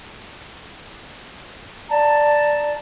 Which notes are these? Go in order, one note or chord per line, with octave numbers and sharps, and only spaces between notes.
D5 A5 A#5